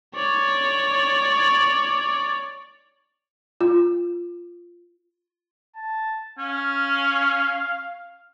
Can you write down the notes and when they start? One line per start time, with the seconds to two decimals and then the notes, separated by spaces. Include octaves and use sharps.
0.15 C#5 D5
3.61 F4
5.76 A5
6.38 C#4 F5